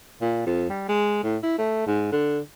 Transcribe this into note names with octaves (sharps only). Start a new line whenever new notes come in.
A#2
F2
G3
G#3
A2
E4
A3
G#2
D3